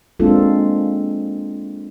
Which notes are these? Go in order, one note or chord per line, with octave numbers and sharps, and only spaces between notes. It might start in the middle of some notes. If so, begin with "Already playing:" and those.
G#3 A#3 C4 D4 F4 A4